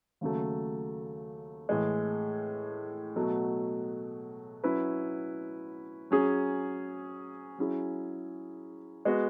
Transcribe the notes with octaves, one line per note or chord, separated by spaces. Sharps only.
D#2 C#3 F#3 A3
A2 E3 G#3
B2 F#3 A3
F#3 C#4 E4 B4
F#3 C#4 G#4
F#3 C#4 E4 G#4
G#3 B3 F#4